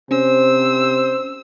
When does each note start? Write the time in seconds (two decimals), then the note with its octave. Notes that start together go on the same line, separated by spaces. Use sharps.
0.11 C3 C#4 C5 E6